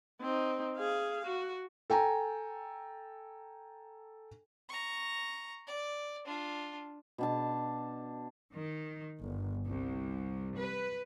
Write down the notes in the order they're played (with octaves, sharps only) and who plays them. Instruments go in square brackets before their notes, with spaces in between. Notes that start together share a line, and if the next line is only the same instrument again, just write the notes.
[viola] C4 D#4
G#4 F5
F#4
[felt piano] A4 G5 G#5 A#5
[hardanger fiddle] A#5 C#6
D5
D4 F4
[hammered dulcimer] B2 D4 A5
[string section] D#3
G1
C2
B4